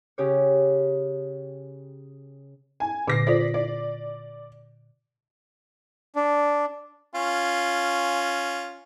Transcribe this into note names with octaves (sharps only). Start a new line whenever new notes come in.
C#3 G4 C#5
G#5
A#2 D3 D6 A#6 C7
F4 A4 C5 D5 B6
D5
D4
C#4 F4